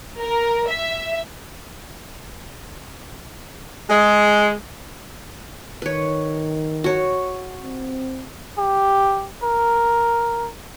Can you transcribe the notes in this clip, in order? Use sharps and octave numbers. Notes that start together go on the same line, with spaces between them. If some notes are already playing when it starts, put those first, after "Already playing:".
A#4
E5
G#3
D#3 B4 C#5
F#4 C#5
C4
G4
A#4